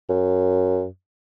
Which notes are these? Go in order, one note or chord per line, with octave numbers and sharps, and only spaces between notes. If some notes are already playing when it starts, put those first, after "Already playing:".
F#2